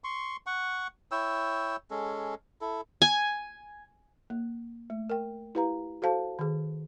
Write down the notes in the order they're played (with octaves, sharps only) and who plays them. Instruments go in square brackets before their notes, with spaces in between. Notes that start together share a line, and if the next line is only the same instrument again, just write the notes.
[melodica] C6 C#6
F#5 C#6
E4 C#5 G5 E6
G#3 C#4 A4
E4 A4
[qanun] G#5
[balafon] A#3
A3
A#4 G5
E4 G4 B4 F5 A#5
F#4 A4 C5 F5 A5
D#3 G#4